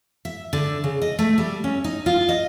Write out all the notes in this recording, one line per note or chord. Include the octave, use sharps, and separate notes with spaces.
E5
D3
C#3
D#5
A3
G3
C#4
D#4
F4
D#5